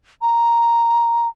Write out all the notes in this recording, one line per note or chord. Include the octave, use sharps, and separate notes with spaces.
A#5